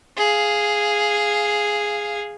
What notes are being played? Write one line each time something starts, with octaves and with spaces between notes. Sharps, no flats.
G#4 F5